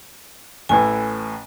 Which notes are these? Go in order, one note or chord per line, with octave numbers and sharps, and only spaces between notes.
A1 A2 E3 G#5